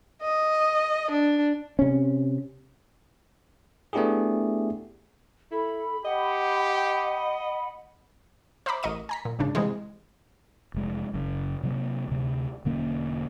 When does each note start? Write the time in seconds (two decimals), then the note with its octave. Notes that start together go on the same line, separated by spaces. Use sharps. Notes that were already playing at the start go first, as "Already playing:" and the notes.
0.22 D#5
1.11 D4
1.79 C3 C#4
3.93 A3 B3 D4 E4 G4 G#4
5.51 E4 A4 B5
6.05 G4 D#5 F#5
8.66 C5 E5 A#5 B5 D6
8.83 A1 A#4 D#5 C#6 D#7
9.09 G#5 A#5 B6
9.25 A#2
9.39 G#1 C#3 D4
9.55 G#2 C3 E3 G#3
10.74 F1 G#3
11.14 F#1 F#2 C#3
11.63 C3 F#3 A#3
12.08 D2 C3
12.65 E1 D3 A#3 C#4